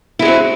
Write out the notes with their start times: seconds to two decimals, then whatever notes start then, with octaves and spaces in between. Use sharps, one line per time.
0.19 E4
0.22 G#3
0.25 F#4
0.28 C4